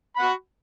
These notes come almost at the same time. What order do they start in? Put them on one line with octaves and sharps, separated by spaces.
B5 F#5 F#4